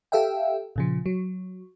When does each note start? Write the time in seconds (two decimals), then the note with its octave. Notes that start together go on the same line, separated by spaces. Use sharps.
0.12 G4 A4 E5 F5 G5
0.76 A#2 C#3 F3
1.06 F#3